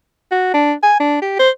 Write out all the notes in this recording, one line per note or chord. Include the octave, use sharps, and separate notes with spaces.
F#4
D4
G#5
D4
G4
C5